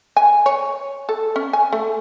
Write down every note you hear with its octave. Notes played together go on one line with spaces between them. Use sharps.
G#5
C#5
A4
C#4
G#5
A3